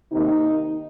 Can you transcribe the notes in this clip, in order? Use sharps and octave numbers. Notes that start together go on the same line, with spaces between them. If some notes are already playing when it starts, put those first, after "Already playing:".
C3 D#3 A#3 D#4